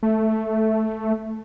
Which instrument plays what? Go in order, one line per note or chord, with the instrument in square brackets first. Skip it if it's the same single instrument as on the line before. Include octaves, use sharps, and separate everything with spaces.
[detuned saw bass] A3